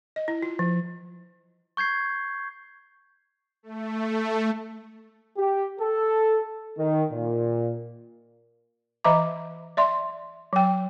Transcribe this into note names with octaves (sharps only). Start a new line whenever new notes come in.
D#5
E4
F4
F3
C#6 G6 G#6 C7
A3
G4
A4
D#3
A#2
E3 D#5 E5 A#5 D6
D5 E5 C6
F#3 G5